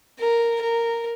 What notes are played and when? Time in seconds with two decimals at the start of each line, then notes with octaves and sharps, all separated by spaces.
0.20 A#4
0.62 A#4